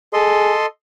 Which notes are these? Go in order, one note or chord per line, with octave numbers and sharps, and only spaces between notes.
G#4 A4 D#5 C6